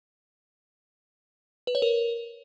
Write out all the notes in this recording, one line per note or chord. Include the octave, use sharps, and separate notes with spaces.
B4
C#5
A#4